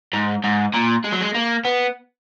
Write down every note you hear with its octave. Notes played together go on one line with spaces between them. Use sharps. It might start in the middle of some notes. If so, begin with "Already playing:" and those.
G#2
G#2
A#2
G#3
F#3
G#3
A#3
B3